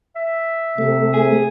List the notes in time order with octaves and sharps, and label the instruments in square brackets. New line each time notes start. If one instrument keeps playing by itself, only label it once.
[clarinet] E5
[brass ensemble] C3 [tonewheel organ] A3
[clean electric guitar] G#4